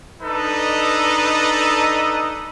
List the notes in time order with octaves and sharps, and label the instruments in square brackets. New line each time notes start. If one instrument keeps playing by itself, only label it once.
[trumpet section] D4 D#4 A4 B4 D#5